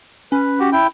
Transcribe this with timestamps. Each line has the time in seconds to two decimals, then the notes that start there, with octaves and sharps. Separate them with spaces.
0.32 C#4 B4
0.60 F#4 G4
0.72 E4 G5